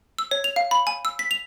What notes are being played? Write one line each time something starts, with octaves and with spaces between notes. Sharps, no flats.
E6
C#5
F7
F5
B5
G#5
E6
B6
F7